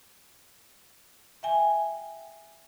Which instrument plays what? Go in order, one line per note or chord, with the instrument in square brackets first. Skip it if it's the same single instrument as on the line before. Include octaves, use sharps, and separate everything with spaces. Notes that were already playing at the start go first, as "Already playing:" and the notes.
[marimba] E5 G5 G#5